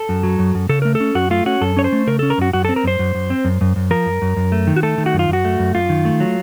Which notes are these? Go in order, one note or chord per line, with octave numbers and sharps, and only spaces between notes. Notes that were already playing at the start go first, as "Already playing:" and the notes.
Already playing: A4
F#2
F#3
F#2
F#2
C#3 A4
A3 A#4
A4
C#4
F#2 F#4
A3 F4
C#4 F#4
F#2 A4
C#4 C#5
C5
A3
C#3 A#4
C#4 A4
A#4
F#2 F#4
F#2 F#4
C4 A4
A#4
F#2 C5
F#2
F#2
C4
F#2
F#2
F#2
F3 A#4
F#2
F#2
F#2
A3
D#3
F#4
A3 A4
D#3
F#4
F#2
F4
F#2 F#4
A3
F#2
F#2 F4
D#3
A3
F#3